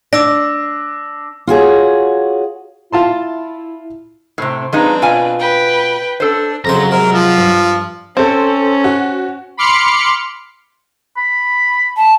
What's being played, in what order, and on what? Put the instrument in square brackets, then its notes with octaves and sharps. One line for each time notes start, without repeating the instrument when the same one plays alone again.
[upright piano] D4 [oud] D5 [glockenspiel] D6 E6 A#6
[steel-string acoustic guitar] F4 F#4 G#4 C#5
[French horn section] E4 [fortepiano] F4 A5 C6
[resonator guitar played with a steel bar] A2 C3 [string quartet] C4
[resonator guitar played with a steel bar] F3 G#3 D#4 [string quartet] C4 D4 B4
[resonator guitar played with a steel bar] B2 F4 G#5
[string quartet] B4 G5
[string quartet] D4 [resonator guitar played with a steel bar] A4 C5
[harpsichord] F2 C#3 C5 [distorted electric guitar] F#3 A#5
[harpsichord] C3 G#3 [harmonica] A#4
[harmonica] F3
[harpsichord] G2
[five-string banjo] C4 [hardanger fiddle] C#4 [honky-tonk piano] A4 C5
[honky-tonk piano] F#4
[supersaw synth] B5 C6 D6 F6 C#7
[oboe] B5
[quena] A5